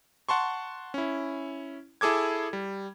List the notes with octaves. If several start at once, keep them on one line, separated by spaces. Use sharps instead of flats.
F#5 A5 C6 C#6
C#4 E4
E4 G#4 A4 D6 G#6
G3